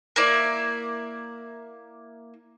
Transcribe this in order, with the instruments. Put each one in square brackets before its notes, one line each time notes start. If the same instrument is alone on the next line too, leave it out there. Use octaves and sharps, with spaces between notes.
[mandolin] A#3 E4 D5